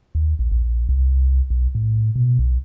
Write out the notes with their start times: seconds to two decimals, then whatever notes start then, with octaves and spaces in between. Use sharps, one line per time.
0.15 D#2
0.39 A#1
0.52 A#1
0.89 C2
1.50 B1
1.75 A2
2.16 B2
2.39 B1